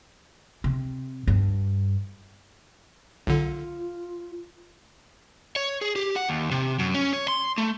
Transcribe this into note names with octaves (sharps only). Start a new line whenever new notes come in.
C3
G2
B1 D3 F4
C#5
G#4
G4
F#5
D#2
C3
F#2
C#4
C#5
C6
A3